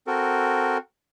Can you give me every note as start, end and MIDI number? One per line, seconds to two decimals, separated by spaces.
0.07 0.78 60
0.07 0.78 66
0.07 0.78 69
0.07 0.78 70